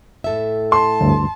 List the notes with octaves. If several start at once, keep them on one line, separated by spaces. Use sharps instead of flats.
A2 A4 E5
A5 C6
D2 G2